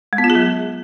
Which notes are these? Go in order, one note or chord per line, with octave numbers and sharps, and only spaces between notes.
G#3
B3
F4
G#4
F#3